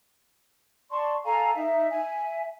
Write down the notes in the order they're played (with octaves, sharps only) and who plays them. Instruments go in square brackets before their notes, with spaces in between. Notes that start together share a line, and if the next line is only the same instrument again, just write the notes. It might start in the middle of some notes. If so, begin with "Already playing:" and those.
[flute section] D5 A5 C6 C#6
A4 F5 G#5 A#5
D#4 E5
E5 G#5